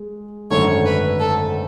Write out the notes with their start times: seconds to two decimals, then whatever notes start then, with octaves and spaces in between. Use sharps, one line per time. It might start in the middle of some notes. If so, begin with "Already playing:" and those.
Already playing: G#3
0.50 G#1 F#2 D3 A3 C#5
0.85 B4
1.19 A4